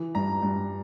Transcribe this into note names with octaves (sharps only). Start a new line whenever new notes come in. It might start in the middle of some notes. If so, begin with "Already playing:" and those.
Already playing: E3
G2 A#5
G2